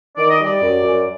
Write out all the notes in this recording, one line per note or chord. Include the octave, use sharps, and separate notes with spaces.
D#3 D5
D#5
G3 D5
F#2
F#2